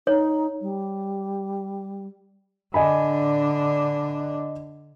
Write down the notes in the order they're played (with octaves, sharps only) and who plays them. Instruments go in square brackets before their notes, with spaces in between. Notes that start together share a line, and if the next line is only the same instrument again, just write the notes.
[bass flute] D#4 [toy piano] C#5
[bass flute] G3
[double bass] D3 D4 [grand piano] D#5 G#5 B5